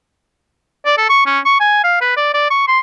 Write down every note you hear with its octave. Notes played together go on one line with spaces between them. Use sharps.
D5
A4
C#6
C#4
C#6
G#5
F5
B4
D5
D5
C#6
C6